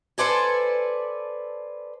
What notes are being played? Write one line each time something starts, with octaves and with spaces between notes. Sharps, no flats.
A4 B4 C5 D5 G#5 A5